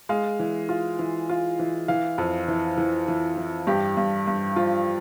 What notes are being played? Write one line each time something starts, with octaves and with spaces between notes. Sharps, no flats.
G#3 F5
E3
F4
E3
F4
E3
E3 F5
F2
E3
E3
E3
E3
G2 G4
G2
G2
F3 F4